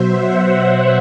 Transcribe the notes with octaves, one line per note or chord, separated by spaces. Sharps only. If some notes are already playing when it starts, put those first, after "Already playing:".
Already playing: B2 F#3 C5 E5
F#5